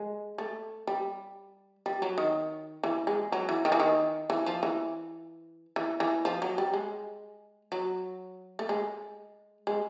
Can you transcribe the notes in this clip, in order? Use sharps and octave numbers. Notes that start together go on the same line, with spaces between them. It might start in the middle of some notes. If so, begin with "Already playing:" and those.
Already playing: G#3
A3
G3
G3
F#3
D#3
E3
G#3
F#3
E3
D#3
E3
D#3
E3
F3
E3
E3
E3
F3
F#3
G3
G#3
F#3
A3
G#3
G#3